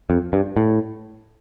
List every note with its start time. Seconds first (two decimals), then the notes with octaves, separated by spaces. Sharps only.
0.10 F2
0.33 G2
0.57 A2